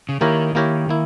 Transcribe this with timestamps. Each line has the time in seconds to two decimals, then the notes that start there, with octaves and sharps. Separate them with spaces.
0.09 C#3
0.21 D#3 A#3 E4 G4 A#4 C#5
0.55 A#3 E4 G4 A#4 C#5
0.89 A#3 E4